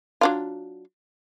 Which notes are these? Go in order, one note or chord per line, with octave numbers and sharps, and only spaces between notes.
F#3 D4 F4